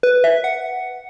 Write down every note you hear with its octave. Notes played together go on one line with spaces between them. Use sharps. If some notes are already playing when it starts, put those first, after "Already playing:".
B4
E5
F#5